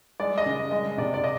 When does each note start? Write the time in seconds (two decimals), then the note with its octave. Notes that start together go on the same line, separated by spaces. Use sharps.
0.20 G#3 D5
0.38 D#5
0.46 C#3
0.71 G#3 D#5
0.97 C3 D5
1.14 D5
1.24 D#5